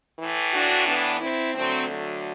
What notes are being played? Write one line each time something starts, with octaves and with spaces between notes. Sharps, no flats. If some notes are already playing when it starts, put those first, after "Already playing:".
E3
A2
D4 F#4
B3 D4
C4 E4
D2 D3 F#3 A3 C4
F#3 A3